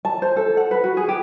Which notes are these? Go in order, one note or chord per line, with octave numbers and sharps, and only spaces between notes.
A5
C5
A4
F#5
B4
F#4
G#4
G4